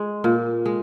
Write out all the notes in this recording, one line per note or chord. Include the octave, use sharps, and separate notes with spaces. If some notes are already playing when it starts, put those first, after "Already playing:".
Already playing: G#3
A#2
G#3